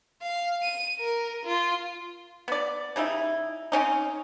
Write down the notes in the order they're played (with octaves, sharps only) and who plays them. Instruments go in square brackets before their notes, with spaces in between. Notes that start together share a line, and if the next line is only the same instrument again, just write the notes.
[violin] F5
D#7
A#4
F4
[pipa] B3 D5
C#3 G3 D#4 E4
C4 C#4 D#4